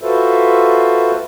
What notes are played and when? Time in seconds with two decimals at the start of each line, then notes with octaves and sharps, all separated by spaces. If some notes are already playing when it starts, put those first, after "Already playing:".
0.02 F4 F#4 A4 B4 C5 E5